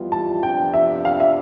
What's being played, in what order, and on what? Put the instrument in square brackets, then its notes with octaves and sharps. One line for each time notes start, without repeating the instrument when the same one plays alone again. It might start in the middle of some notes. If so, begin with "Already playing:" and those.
Already playing: [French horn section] F2 E3 G3 B3 F4
[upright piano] A5
[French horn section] F2 C3 F3 B3 D4 [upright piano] G5
[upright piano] E5
F5
E5